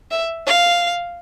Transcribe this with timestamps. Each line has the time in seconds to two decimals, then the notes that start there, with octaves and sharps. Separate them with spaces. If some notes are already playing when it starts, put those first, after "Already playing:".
0.11 E5
0.47 F5